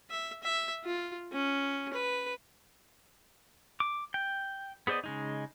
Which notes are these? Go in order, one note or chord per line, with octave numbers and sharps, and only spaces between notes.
E5
E5
F4
C#4
B4
D6
G5
B3 G#4 C5 D5 D#5
C#3 G#3 D#4